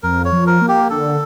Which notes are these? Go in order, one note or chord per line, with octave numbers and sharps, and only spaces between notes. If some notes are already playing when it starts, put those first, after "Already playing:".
F2 A#4
C#5
F3
A#4
A#3
G4
D3 A4